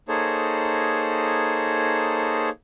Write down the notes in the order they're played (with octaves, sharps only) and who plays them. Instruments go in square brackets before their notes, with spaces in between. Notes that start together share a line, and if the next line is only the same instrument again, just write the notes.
[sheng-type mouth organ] A#3 D#4 G#4 A4 C5 C#5